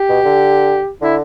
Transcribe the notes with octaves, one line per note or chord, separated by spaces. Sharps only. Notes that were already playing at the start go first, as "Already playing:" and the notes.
Already playing: G4
B2
D3
D3 E4